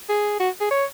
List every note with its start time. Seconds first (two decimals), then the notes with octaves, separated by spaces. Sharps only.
0.09 G#4
0.40 F#4
0.61 G#4
0.71 C#5